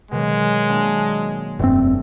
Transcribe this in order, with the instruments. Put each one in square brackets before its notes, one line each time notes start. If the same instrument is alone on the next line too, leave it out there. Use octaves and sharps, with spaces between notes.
[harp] B2 D#3 F#3 [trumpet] G#3
[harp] A#3 D4 A5
[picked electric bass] F1 C4 [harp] G2 A3